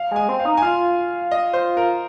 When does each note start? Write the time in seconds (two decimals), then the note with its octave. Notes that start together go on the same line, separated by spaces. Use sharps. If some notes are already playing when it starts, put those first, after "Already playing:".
Already playing: F5
0.11 G#3 G#5
0.29 C4
0.40 F5
0.45 D#4
0.57 G#5
0.62 F4 F5
1.31 D#5
1.53 C5
1.77 A#4